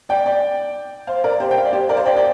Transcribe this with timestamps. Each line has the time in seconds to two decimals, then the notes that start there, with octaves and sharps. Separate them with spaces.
0.09 D5 G5
0.25 D5 G5
1.07 C5 F5
1.24 A#4 D5
1.40 G4 C5
1.51 G5
1.58 F5
1.65 D5
1.73 G4 C5
1.89 A#4 D5
1.97 C5 F5
2.06 D5 G5
2.16 D5 G5